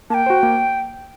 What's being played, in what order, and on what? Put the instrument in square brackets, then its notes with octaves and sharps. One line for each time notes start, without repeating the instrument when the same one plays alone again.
[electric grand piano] A#3 [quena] G5 A5
[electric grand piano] F#4 C5
A#3